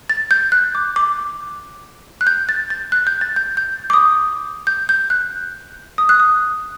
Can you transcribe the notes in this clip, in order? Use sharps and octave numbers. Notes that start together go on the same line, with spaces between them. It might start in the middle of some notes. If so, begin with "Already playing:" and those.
A6
G6
F#6
D6
D6
F#6
G6
A6
A6
F#6
G6
A6
G6
G6
D6
D#6
G6
G6
F#6
D#6
F#6
D#6